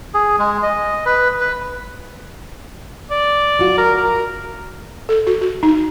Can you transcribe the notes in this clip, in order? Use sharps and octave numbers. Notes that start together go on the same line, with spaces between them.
G#4
G#3
D#5
B4
B4
D5
F#3 F4 F#4
A#4
A#4
A4
F#4
F#4
D#4